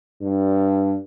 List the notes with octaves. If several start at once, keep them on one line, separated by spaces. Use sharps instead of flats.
G2